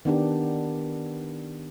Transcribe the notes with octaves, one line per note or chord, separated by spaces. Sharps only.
D#3 B3 D4 G4